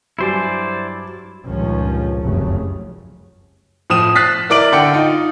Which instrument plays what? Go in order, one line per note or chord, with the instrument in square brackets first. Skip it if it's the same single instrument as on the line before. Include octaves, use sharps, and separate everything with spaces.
[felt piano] G2 F#3 G#5 [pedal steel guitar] E4 C5 D5
[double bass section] C#2 G2 A#2 D#3 F3 C#4
F1 C2 F#2 C#3 A3
[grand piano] A2 F3 D#6 D#7 E7
F#6 A6 B6 C7
E4 A#4 D5 D6 D7 F#7
D3 G5 C#7
D#4 F4